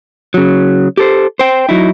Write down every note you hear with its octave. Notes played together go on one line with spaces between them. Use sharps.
C#3 F#3
G4 A4 C5
C5 G5
F#3 D#4 E4